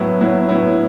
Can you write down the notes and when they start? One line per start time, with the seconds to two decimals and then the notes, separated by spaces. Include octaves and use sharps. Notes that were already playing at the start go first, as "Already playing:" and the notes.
Already playing: A2 F#3 B3 E4
0.21 A2 F#3 B3 E4
0.49 A2 F#3 B3 E4